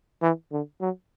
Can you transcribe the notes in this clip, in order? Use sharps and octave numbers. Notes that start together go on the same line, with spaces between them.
E3
D3
F#3